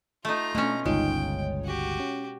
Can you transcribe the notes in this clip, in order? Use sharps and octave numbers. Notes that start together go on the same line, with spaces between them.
A3 D#4 F4 A#5
B2 A3 C#4 D4
G1 C#2 G#3 D#4 F4 C#5 G5
F#4 G4
C#4